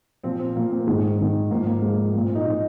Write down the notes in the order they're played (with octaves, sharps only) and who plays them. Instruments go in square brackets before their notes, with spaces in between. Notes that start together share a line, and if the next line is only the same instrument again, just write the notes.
[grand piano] A#2 F3 C4
C4
A#2 F3 A#3
C4
A#3
G#2 D#3 G#3
G#2 D#3
G#2 F3 A#3
A#3
G#2 F3 G#3
F3 A#3
A#2
C4
D#4
A#2 F3 D#4